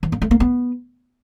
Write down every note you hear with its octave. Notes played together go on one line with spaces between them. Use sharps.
E3
A#3
A3
A#3
B3